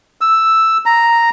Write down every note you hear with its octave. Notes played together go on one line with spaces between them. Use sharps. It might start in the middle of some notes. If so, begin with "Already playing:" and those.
E6
A#5